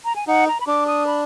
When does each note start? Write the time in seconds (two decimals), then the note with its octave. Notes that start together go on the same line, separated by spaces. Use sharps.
0.05 A#5
0.16 G#5
0.27 D#4 F#5
0.48 A#5
0.60 B5
0.67 D4 D6
0.87 D#6
1.06 B5